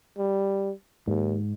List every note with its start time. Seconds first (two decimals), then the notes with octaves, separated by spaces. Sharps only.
0.18 G3
1.08 D#2 G#2